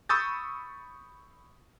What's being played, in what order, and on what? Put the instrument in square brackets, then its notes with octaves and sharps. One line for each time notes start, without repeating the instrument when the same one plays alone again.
[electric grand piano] B5 C#6 D#6 E6 G6 A6